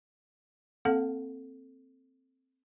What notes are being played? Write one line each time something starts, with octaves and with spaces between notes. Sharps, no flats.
A#3 C4 A4 F5 F#5